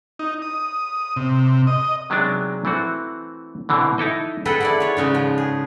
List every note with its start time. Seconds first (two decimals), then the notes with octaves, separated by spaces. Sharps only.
0.19 D#4
0.42 D#6
1.17 C3
1.67 D#5
2.10 C3 F#3 G#3 B3 D4 D#4
2.65 E3 A3 C4 F#4
3.69 B2 D3 E3 C4
3.98 D#4 E4 A4 D#5
4.45 G#4 A4 B4 D#5 F#5 G5
4.60 E4 D5 F#5
4.80 F4 C#5
4.97 G#2 C#3 G#3
5.15 F3
5.38 G#4